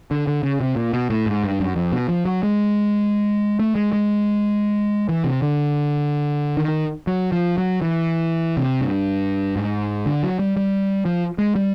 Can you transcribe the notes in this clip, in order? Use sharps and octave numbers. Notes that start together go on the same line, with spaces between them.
D3
D3
C#3
C3
A#2
B2
A2
G#2
G2
F#2
F2
B2
F3
F#3
G#3
A3
G#3
G#3
E3
C3
D3
D#3
F#3
F3
F#3
E3
C3
G2
G#2
D3
F#3
G3
G3
F3
G#3
G3